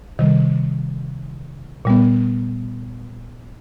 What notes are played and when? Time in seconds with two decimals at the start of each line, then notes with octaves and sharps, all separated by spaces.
0.19 C3 D#3 G3
1.85 A#2 G3 B3